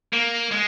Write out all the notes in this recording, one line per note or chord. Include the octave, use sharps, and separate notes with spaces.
A#3
G#3